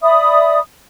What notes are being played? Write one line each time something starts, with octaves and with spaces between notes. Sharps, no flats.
D5 E5 B5 D#6